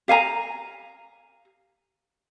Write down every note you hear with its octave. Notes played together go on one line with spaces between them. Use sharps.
G4 F5 G#5 A#5